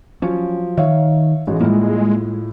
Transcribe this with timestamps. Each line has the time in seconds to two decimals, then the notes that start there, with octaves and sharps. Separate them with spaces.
0.22 F3 F#3 C#4
0.77 D#3 C#5 E5 F5
1.47 A1 G#3 F#4
1.60 A2 G3 A#3 F4